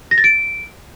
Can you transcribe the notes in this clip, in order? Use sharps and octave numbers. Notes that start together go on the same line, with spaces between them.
A#6
A6
D7